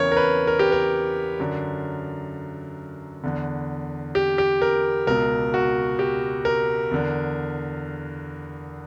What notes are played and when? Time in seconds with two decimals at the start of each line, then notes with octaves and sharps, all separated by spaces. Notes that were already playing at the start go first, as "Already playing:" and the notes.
Already playing: E2 C#3 E3 A#4 C#5
0.12 A#4
0.17 B4
0.47 A#4
0.59 G4
0.72 A#4
1.40 F#2 D3
3.23 E2 D3
4.15 G4
4.38 G4
4.62 A#4
5.07 C#2 B2 A#4
5.54 F#4
5.99 G4
6.45 A#4
6.91 E2 D3